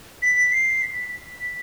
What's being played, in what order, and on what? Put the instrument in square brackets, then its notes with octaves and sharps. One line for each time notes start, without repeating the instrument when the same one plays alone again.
[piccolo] B6
C7
B6
B6